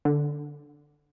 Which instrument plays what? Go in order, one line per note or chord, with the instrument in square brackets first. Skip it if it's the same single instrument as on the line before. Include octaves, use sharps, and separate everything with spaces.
[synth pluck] D3